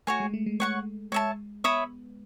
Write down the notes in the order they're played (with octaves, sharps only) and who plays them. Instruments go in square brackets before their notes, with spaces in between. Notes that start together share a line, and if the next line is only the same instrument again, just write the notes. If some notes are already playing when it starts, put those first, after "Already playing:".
[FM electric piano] A3 [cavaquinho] F#4 C#5 G#5
[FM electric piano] G#3
A3
G#3
[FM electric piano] G#3 [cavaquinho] C#5 F#5 C#6
[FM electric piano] G#3 [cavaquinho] C#5 E5 A5
[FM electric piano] B3 [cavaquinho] C#5 E5 B5 D#6